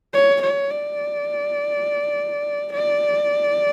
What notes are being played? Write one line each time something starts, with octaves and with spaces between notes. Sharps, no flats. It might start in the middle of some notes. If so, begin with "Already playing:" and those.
C#5
C#5
D5
D5